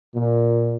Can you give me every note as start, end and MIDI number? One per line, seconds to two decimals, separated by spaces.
0.15 0.74 46